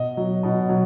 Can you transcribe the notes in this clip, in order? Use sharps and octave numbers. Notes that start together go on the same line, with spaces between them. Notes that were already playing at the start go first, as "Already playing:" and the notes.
Already playing: B2 D#5
F#3
B2
F#3